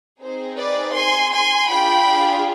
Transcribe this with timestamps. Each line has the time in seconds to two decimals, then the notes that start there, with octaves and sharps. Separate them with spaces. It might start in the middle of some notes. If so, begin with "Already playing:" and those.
0.21 C4 D#4 G#4 C5
0.58 B4 D5
0.95 G#5 C6
1.32 G#5 C6
1.68 D4 F4 G#4 G5 B5